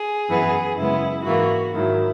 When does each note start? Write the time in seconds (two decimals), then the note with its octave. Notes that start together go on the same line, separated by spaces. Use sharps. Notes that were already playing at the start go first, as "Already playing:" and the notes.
Already playing: G#4
0.29 F#2 E3 B3
0.78 F#2 C#3 G#3 B3 E4
1.26 G#2 E3 A#3 F#4
1.74 G#2 D#3 F#3 E4